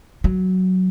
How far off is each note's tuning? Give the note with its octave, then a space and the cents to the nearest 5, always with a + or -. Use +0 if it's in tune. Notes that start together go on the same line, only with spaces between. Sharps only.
F#3 +5